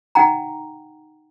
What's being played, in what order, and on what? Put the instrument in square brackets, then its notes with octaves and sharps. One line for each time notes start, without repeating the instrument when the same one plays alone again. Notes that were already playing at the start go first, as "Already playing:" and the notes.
[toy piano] D#4 F#5 G5 A#5